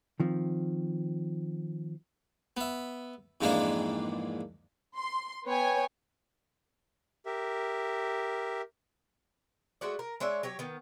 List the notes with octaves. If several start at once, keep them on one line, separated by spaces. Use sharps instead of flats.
D#3 F3 C4
B3 E5
F2 G#2 E3 G#3 A#3 D4
C6
B3 B4 C#5 G5 G#5
G4 A#4 E5
G#3 A3 F#4 D5
A#4
G#3 D4 C#5 E5
F#3 G4 C#5
D#3 B3